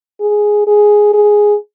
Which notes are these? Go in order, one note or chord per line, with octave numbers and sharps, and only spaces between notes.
G#4
G#4
G#4